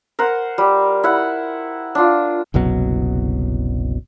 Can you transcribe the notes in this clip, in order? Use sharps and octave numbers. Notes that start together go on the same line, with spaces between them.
A#4 C5 F#5
G3
E4 F#5
D4 F4
F#1 C2 B2 F#3